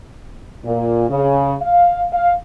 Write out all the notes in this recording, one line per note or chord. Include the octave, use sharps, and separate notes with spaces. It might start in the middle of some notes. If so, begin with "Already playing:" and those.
A#2
C#3
F5
F5